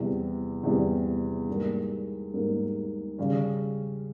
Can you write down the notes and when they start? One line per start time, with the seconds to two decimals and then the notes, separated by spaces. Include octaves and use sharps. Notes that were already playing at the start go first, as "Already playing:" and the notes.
Already playing: E2 C3 G3
0.64 E2 C3 G3
1.47 G#2 G3 A#3
2.33 G#2 G3 A#3
3.18 C#3 G3 C#4